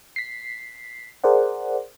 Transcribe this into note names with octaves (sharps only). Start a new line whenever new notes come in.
B6 C7
G#4 A#4 C5 D5 F#5